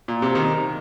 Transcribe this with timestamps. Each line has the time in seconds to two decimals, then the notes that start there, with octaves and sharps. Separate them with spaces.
0.08 A#2
0.22 C3
0.35 D#3